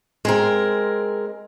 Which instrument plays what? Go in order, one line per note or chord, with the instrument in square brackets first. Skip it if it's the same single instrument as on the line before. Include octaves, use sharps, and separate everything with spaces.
[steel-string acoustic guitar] G#3 C4 A#4